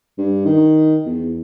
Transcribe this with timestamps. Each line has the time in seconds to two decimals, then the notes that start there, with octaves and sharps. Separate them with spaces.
0.18 G2
0.46 D#3
1.05 E2